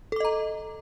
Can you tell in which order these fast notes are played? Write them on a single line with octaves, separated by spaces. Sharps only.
A4 D6 D#5 A#5